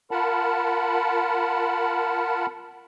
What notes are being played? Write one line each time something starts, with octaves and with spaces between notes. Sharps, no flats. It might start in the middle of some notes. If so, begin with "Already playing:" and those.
F4 A#4 F#5 A5 B5